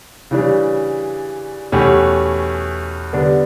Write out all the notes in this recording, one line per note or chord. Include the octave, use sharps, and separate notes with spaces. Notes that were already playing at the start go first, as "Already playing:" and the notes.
C#3 E3 G3 D4
E2 B2 A3 C#4 G4
D3 G3 B3 D4